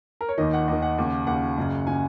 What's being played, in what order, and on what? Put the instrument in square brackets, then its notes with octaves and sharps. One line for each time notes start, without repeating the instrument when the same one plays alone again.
[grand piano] A#4
C#5
D#2 D#3 D#5
F#5
D#2 D#3 D#5
F#5
D#2 C#3
D#2 C#3 F#5
F#1 F#2 C#3
C#3 G#5